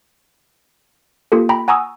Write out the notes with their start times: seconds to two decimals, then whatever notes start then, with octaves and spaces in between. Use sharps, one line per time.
1.32 A#3 F4 G4 A4
1.49 G5 A#5 B5
1.68 F#5 G#5 A#5 C#6 D#6 E6